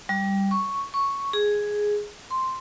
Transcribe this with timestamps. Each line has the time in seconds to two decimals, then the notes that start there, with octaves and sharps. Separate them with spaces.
0.09 G3
0.51 C#6
0.94 C#6
1.33 G#4
2.30 C6